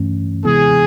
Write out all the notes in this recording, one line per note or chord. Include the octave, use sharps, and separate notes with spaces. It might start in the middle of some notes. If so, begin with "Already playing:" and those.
Already playing: G2 E3 A3 C#4
C3 E3 G#3 B3 E4 G#4